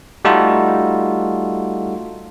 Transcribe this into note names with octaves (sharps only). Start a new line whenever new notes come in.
G3 A3 D#4 F4 F#4 A4